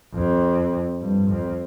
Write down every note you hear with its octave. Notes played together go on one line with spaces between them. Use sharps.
F2
G2
F2